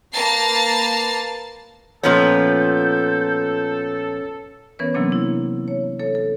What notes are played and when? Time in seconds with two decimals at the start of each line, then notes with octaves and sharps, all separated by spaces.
0.12 A#3 B4 A5 A#5 A6 C7
2.04 A#2 F3 B3 C#4 A4 C#5 G6
4.79 E3 B3 C#4 A#4 B4 C#5
4.94 C3 E3 F#3 A#3 C4 D4
5.12 E4
5.68 C#5
6.00 A4 C#5
6.15 A4